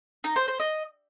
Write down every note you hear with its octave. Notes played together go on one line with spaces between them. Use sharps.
D#4
C5
C5
D#5